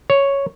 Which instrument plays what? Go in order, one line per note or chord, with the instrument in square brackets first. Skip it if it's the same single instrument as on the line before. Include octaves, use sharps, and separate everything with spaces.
[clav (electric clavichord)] C#5